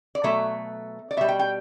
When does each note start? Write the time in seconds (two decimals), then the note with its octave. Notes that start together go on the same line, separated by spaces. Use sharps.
0.15 D5
0.24 B2 F#3 A3 E5
1.11 D5
1.17 B2 G3 E5
1.29 G5
1.39 G5